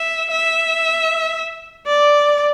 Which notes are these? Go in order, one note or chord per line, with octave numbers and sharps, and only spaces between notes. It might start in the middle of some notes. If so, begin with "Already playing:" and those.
Already playing: E5
E5
D5